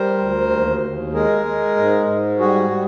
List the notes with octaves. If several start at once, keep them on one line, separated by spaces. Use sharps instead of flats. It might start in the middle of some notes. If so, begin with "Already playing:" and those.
Already playing: G3 A#4 C5
D2
D#2
D#2
G#3 G#4 A#4
G#3
G#2
G#2
G3 F#4 G#4
G3